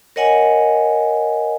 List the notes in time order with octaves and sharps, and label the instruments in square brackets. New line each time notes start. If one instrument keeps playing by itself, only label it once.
[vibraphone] A#4 C#5 D#5 F#5 G#5